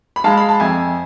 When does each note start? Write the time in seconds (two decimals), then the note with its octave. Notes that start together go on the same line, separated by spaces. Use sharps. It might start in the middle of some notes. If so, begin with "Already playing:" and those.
0.16 B5
0.24 G#3 F5 A5
0.37 B5
0.49 A5
0.60 F2 E5 G#5